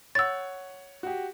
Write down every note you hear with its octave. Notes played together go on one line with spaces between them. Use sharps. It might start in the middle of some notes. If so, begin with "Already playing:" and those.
C#5 F#5 E6 A6
F#4 G4